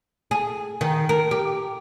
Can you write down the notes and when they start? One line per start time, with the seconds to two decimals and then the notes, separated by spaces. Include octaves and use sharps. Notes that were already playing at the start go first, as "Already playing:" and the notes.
0.31 G#4
0.81 D#3
1.09 A#4
1.31 G4